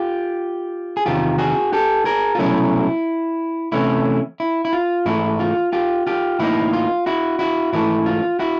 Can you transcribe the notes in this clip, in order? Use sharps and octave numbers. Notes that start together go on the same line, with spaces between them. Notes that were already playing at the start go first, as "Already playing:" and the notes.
Already playing: F4 G4
G#4
E2 C3 D#3 F4 G4
F#4 G#4
G4 A4
G#4 A#4
F4
C2 B2 F#3 A3 C#4 E4
C3 E3 A3 C#4 E4
E4
E4
F4
G#2 E3 A3 E4
F4
F4 G4
F4 G4
A2 E3 G3 A#3 D#4 E4
F4
E4 F#4
E4 F#4
G#2 E3 A3 E4
F4
E4 F#4